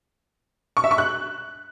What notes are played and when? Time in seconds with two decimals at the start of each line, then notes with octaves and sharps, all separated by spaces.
0.77 C#6
0.84 E5
0.91 C#6
0.98 F#6